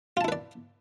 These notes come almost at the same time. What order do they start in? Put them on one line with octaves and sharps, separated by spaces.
F4 A5 E4 B4 D5